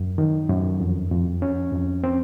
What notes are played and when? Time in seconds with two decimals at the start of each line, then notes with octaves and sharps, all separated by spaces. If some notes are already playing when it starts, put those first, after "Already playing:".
Already playing: F#2
0.18 D#3
0.50 F#2
0.80 F2
1.11 F2
1.42 C#4
1.72 F2
2.04 C4